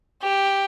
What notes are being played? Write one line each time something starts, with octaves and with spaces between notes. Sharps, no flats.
G4